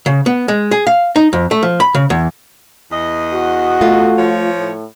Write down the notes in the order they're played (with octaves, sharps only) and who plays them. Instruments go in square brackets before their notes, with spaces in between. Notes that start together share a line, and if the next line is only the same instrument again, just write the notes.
[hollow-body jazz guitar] C#3
B3
G#3
G#4
F5
D#4
F2
A3
F3
B5
C#3
E2
[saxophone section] E2 D#5
[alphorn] F#4
[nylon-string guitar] A3 F4
[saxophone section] F3 C#5
[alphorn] A2